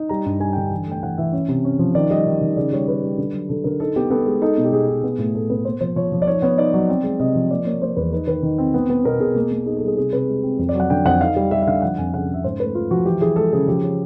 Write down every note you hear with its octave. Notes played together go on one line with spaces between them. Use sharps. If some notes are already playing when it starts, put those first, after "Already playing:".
Already playing: D#4
G3 A#5
G2
G3 G#5
D3 G5
E3 G#5
A3 G5
E3 F#5
E3 E5
C#4
C3
C#4
F3
D#3 D5
G3 D#5
D#3
D#3
C#3 D5
G3 C#5
G3 B4
G3
D3
F#3
D3 A4
D3 A#4
D#4 A4
B3 G4
B3 A4
G#3
D#4 A4
B2
G4
B2 G#4
D#4
B3
A2
A2 A4
B3 B4
A#3 C5
F3 C5
F3 C#5
F3
D5
D#4 C#5
B3 C#5
D#4 D5
F#3
C4
G#3
C3 D#5
F3
A#3 D5
A#3 C#5
A#3 C5
E2 B4
D#4 B4
D#3 B4
D#3
C4
B3
B3
B2 A#4
B2 G#4
A#3
A#3
D#4 G#4
G3 A4
G#4
C3 G#4
C3 B4
G#3
C4
F2
D5
F#3 F#5
D3 G5
F2 F#5
D#4 F5
G3
G3 E5
E5
D3 F5
F3 F#5
F2 G#5
C#3 F#5
C#3
E5
G#2 C5
A3 B4
A3 F4
F3 F#4
E3 G4
E3 G#4
G#3 A4
C#3 G#4
F3 G4
C#4